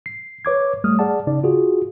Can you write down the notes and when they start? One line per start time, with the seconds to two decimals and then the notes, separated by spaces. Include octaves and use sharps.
0.06 C7
0.45 B4 C#5 D6 G#6
0.84 G3 A3 D#6 F6
0.99 G#4 D5 F#5 A5
1.27 C#3 D#4 D5
1.44 F4 F#4 G#4